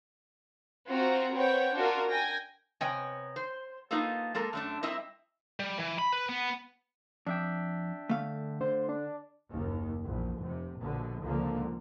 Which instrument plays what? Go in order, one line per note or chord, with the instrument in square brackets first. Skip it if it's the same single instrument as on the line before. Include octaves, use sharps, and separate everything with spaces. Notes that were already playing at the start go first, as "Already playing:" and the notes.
[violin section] C4 F4 F#4 A#5
C4 B4 C#5 F#5 G5
D4 F4 F#4 A#4
G5 G#5 G#6 A#6
[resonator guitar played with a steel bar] C3 B3 C#5 D#5 G5 G#5
C5
A#3 B3 D#4 F4 A4
G#3 A#3 A4 A#4
F#2 A3 D4
G3 C4 E4 A#4 D#5 E5
[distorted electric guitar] G3
E3
B5
B4
B3
[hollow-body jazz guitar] F2 [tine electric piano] D4 E5 G5
[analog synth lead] D3 [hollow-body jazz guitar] A3 F5
[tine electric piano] D3 [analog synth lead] C5
[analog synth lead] D4
[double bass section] F#1 D#2
A#1 E2
F1 C3
A#1 B2 D3
F1 C#2 D3 F3 A#3